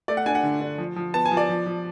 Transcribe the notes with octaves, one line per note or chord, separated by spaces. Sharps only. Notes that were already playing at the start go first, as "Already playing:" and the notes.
A3 D5
F#5
D4 G#5
F#5
D3
D4
F3
F3
B3 A5
G#5
F3
D5
F3
F3